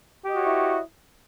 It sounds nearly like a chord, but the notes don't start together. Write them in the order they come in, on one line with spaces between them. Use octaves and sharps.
G4 D#5 F#4 C#5 E4